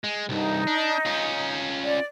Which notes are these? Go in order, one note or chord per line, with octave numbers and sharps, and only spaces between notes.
G#3
C2 G2 D#4
D4
C#4 F4
D5